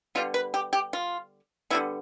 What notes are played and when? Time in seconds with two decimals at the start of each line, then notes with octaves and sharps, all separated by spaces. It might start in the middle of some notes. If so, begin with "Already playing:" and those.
0.15 D3 G3 B3 F4
0.34 B4
0.54 G4
0.73 G4
0.93 F4
1.70 D3 G3 B3 E4